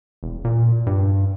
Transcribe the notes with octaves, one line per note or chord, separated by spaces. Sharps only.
E1
A#2
G2